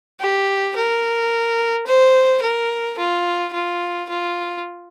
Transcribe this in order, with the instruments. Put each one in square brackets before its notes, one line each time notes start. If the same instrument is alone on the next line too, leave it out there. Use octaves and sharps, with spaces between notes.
[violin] G4
A#4
C5
A#4
F4
F4
F4